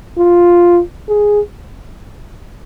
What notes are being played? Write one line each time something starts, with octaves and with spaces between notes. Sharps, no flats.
F4
G#4